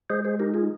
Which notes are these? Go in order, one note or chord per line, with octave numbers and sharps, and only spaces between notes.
G#3 G#4 C5
G#4 C5
D#4 G4 A#4
F4 G#4